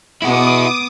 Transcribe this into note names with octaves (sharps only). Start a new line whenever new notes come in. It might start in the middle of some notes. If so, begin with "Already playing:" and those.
B2 B3 E4 F#5 D6 D#6